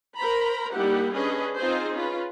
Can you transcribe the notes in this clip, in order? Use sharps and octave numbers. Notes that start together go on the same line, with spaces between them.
A#4 C5 A#5 B5
G3 A#3 D#4 E4 G4 F#5
C#4 D4 G#4 B4 D#5
C4 D#4 F4 G#4 C5
C#4 F4 B4